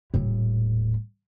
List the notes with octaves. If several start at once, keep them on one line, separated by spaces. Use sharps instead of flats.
D#1 A2